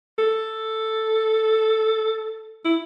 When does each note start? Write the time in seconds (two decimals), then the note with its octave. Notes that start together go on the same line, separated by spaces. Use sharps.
0.18 A4
2.65 E4